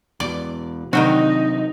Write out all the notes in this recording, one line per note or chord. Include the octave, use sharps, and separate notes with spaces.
E2 B2 D5
C3 D#3 F#3 G3 C4 D4 D#4 F#4